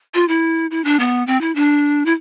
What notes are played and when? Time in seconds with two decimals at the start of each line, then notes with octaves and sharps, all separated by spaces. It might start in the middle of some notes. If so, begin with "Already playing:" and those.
0.14 F4
0.28 E4
0.71 E4
0.85 D4
1.00 B3
1.27 C4
1.41 E4
1.55 D4
2.06 E4